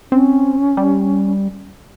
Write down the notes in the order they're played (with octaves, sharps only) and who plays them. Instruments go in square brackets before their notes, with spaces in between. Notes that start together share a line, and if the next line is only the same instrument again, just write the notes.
[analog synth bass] C4 [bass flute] C#4
[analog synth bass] G3